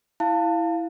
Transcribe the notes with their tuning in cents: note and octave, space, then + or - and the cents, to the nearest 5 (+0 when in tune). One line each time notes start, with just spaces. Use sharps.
E4 +0 F5 +0 A5 +20